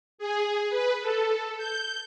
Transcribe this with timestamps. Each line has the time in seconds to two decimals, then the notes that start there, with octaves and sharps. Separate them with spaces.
0.18 G#4
0.70 B4
1.01 A4
1.57 G6